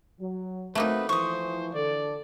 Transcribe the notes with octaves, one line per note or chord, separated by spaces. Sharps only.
F#3
A3 A#3 C4 D#4 F#4 B4
E3 F3 C5 C#6 D#6
D3 A4 D5